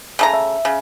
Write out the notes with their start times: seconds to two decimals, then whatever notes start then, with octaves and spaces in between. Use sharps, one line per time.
0.19 C#3 A3 A#5
0.33 E5
0.65 C#3